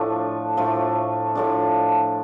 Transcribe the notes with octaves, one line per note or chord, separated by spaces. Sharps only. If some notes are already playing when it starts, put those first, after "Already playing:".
Already playing: A2 F3 A3 D4
A2 F3 A3 D4
A2 F3 A3 D4